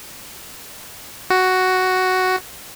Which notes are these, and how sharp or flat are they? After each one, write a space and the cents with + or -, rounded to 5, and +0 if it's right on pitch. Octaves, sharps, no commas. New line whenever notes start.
F#4 +5